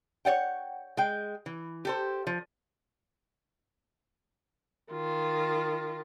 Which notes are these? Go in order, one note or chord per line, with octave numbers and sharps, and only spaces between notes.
C#5 D5 F#5 G5
G#3 G5
E3
G4 A4 C5
F3
D#3 F4